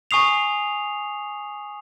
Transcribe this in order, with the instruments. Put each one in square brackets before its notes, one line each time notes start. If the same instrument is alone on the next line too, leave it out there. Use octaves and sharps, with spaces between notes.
[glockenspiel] G#5 C#6 D#6 C7 F7